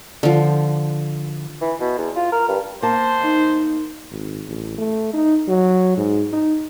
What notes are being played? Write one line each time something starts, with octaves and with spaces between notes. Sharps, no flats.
D3 F3
E3
B2
E2
F4
A#4
G2
A#3 C5 A5
D#4
G#1
A1
A3
D#4
F#3
G#2
D#4